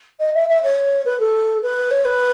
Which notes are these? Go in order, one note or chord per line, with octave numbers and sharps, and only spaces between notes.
D#5
E5
E5
C#5
B4
A4
B4
C#5
B4